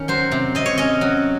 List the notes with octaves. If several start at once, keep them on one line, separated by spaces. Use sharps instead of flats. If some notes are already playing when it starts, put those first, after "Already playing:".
Already playing: D#3 C#4
F#3 C5
C3
C3 D#5
C#5
C#4 D#5
F#3